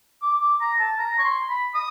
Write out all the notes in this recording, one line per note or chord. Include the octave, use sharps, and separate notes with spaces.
D6
D6
A#5
A5
A#5
C#6
C6
B5
D#6